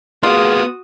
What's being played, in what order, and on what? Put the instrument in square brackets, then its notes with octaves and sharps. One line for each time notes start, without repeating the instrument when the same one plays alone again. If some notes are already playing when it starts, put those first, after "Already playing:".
[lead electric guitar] A#3 B3 [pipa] F4 [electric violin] F#4 D#6 [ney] G#4